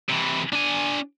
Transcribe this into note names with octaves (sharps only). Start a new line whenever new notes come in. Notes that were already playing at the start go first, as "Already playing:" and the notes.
C3 E3
D4 G#5